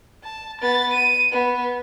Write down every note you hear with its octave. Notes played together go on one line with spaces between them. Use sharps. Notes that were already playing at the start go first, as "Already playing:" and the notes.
A5
B3 A6
D#7
B3